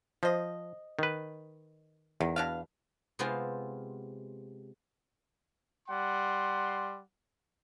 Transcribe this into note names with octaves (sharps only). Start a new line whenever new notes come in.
F3 C5 D#5
D#3 B4
E2 D#3
B2 D4 F5
C3 G#3 B3 C4 F4
G3 F#5 C6